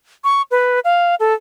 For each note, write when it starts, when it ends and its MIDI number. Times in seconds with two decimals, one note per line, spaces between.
0.24 0.42 85
0.51 0.80 71
0.84 1.15 77
1.20 1.34 69